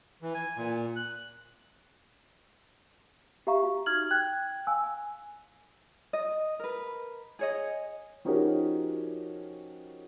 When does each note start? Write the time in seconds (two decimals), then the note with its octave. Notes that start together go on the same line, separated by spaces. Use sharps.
0.22 E3
0.34 G#5
0.57 A#2
0.96 F#6
3.47 G4 E5 F5 A#5 C#6
3.63 F#4
3.86 D#4 F6 G#6 F#7
4.11 G5 F#6 G#6
4.67 F5 G#5 E6
6.13 D#5
6.59 A#4 B4
7.39 G#4 C#5 D#5
8.25 F3 C#4 D#4 F#4 G4 A#4